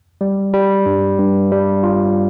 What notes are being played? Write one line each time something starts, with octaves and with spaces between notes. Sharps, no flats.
G3
G3
G2
G2
G3
F4